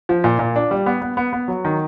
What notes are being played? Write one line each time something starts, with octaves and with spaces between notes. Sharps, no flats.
F3
A#2
A#2
D4
G3
B3
B3
B3
B3
F#3
D#3